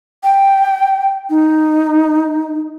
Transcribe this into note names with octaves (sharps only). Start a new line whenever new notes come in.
G5
D#4